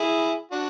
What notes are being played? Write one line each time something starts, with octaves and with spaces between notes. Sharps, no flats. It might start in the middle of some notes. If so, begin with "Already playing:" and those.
Already playing: E4 G#4
D4 F#4